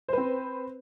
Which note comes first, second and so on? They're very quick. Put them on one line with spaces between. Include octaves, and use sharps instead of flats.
C5 B4 C4